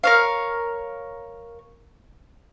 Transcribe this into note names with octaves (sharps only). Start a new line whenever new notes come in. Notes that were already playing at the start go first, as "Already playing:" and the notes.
A#4 C#5 F5